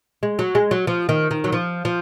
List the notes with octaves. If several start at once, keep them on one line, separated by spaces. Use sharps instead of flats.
G#3
F#3
G#3
F#3
F3
D#3
D#3
F#3
F3
F3